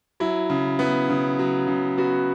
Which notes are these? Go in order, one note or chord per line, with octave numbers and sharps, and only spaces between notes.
F#3 E4
C#3
B3 E4
C#3
F#3
C#3
B3 F#4